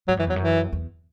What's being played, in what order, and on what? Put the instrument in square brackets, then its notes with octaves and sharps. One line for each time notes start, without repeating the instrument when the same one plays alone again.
[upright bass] G#2 [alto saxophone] F#3
[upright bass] F#2 [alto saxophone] E3
[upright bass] E2 [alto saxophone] F#3
[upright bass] F#2 [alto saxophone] E3
[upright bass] E2